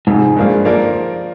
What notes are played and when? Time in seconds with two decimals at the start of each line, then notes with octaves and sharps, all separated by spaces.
0.07 F2 G#2 C3 F3
0.36 G2 F3 A#3 F4 G#4
0.65 F3 A#3 F4 A#4 D5